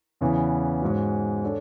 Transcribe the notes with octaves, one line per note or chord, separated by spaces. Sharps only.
E2 C#3 E3 B3
G#2 G#3 C#4 F#4
D4 A4 C#5